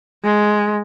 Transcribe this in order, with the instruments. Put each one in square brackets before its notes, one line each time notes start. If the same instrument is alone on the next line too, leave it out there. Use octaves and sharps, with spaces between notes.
[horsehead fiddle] G#3